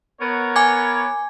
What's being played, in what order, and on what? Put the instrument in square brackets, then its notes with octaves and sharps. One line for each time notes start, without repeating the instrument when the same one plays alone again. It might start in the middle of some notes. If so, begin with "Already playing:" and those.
[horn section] B3 A#4 C#5
[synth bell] G#5 D6 G#6